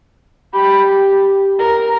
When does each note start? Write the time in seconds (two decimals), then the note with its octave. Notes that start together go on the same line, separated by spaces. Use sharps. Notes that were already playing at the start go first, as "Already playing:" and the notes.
0.53 G4 B5
1.59 A#4 A#5